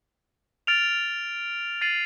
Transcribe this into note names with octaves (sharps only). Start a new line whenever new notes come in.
F6 A6 D7 F7
A6 C7 D#7 F#7